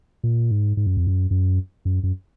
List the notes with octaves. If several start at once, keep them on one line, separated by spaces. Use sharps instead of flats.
A#2
G#2
G#2
F#2
F2
F#2
F#2
F#2
F#2